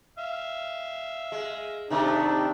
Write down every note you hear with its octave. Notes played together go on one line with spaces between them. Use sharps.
E5 F5
G#3
C3 D#3 A3 D4 D#4